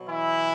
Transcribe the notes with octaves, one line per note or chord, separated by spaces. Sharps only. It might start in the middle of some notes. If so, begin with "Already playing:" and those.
Already playing: B2 F#3
E3 E4